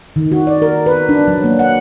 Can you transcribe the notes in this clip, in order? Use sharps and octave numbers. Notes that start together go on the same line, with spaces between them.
D#3
F#4
D5
A#4
B4
D4
F#3
A#3
F#5